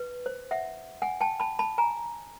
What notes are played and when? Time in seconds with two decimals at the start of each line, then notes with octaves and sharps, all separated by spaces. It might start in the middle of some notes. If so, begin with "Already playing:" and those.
Already playing: B4
0.26 C5
0.51 E5 F#5
1.02 F#5 G#5
1.21 G5 A5
1.40 A5 B5
1.59 A5 B5
1.78 G#5 A#5